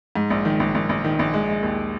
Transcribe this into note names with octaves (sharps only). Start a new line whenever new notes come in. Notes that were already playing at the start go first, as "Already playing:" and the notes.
G#2
A#1
D#3
A#1
A#1
A#1
D#3
A#1
G#3
G#3
D#2